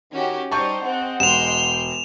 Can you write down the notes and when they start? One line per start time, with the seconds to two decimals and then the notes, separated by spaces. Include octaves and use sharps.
0.12 D#3 C#4 F#4 G4
0.51 G3 D#4 C5 A5 C#6 G6
0.82 C4 G#4 D#5 F#5
1.20 E1 G5 C6 E7 F7